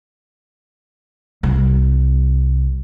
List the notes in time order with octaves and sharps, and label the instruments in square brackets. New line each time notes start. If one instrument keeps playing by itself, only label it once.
[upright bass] C2